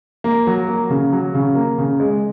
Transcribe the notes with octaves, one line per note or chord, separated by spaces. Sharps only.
A#3
F#3
A#3
C#3
F#3
C#3
A#3
C#3
G#3